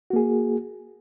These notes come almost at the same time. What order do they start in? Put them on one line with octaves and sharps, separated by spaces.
F#4 A#3 G#4